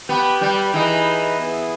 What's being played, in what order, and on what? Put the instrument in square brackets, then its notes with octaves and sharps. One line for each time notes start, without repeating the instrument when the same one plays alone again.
[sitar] B3 [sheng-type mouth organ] G4 B4 G5
[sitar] G3
[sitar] E3 [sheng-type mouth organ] D#4 G#4 B4 D#5
[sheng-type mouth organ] B3 E4 G#4